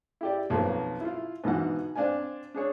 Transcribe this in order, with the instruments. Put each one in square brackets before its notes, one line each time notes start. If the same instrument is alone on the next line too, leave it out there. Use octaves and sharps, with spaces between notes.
[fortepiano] E4 G4 D5
B1 F2 D#3 F3 A#3 B3
E4 F4
G#2 B2 D3 E3 F#5
C4 D4 D5 F5 G#5
D4 G#4 C#5